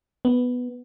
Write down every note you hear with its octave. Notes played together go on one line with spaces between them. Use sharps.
B3